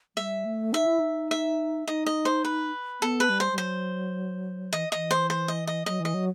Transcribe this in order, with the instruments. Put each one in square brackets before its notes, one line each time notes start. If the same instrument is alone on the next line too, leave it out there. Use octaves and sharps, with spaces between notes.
[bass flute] G3 [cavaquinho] E5
[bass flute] A3
[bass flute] D#4 [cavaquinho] E5
[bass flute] E4
D#4
[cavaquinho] E5
[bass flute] D#4 [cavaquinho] D#5
[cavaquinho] D#5
C5
B4
[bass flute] B3 [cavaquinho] A4
[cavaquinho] B4
[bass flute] G3
[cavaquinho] C5
[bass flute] G3
[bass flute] F#3 [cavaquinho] C5
[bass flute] E3 [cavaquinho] D#5
[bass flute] E3 [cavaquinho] D#5
[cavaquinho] C5
C5
D#5
D#5
[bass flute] F#3 [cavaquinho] D#5
[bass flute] E3 [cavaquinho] D#5
[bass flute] F#3